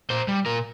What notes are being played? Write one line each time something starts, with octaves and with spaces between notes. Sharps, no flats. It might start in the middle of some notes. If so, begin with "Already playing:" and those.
A#2 C5
G3
A#2 A#4